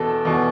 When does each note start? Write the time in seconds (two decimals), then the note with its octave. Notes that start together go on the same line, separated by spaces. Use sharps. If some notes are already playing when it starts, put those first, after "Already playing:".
Already playing: E2 B2 A4
0.25 E2 B2